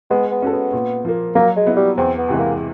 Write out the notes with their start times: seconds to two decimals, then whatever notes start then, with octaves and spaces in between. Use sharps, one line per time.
0.11 G#3 B3
0.31 B3
0.42 C#4 F#4 A4
0.52 B3
0.73 A#2
1.05 F3 A#3
1.35 F#3 A#3
1.57 G#3
1.67 B3 E4
1.77 G3
1.98 E2 C4
2.18 B3
2.29 C3 E3 G#3
2.39 A#3